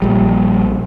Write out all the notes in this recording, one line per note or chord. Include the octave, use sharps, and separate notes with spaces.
A#1 G3